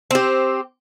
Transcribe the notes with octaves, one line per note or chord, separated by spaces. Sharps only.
C4 G4